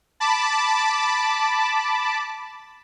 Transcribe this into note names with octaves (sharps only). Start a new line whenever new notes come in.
A5 B5 D6